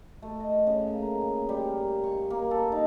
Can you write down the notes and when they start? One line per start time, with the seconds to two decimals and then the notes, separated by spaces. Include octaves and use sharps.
0.22 A3
0.40 D#5
0.67 C#3
0.89 A#3
1.02 A#5
1.21 G#4
1.49 G3
1.68 A#4
2.03 C#6
2.30 A#3
2.51 A4
2.72 D#4